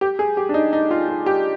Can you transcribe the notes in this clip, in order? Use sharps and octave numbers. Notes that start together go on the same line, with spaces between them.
G4
G#4
G4
D4
D#4
D#4
F4
F4
G4